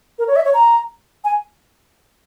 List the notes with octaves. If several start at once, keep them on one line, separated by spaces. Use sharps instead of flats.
A#4
C#5
E5
C#5
A#5
G#5